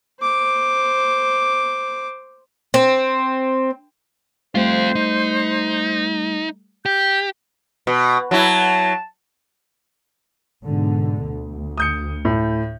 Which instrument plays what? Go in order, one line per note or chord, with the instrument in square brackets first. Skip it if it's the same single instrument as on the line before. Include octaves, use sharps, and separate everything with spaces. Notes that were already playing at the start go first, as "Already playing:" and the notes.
[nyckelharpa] C5 D6
[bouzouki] C4
[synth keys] G3 A3 [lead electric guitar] C4 F4 [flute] C5
[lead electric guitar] D#4
[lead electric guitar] G4 [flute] G6
[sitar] B2
[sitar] F#3 E4 [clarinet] A5
[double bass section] G#2 B2 D3
D2
[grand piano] D#6 G6 C#7
A2